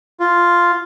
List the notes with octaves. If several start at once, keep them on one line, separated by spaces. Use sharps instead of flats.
F4